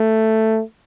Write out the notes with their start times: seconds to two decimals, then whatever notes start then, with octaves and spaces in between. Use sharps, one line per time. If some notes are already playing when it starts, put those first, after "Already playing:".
Already playing: A3